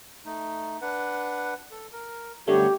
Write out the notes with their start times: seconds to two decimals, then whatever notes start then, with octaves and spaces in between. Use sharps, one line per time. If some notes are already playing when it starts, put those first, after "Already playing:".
0.25 A3 D#4
0.82 D4 B4 F#5
1.71 A4
1.92 A#4
2.47 F#2 D3 G3 A3 B3 G4 C#5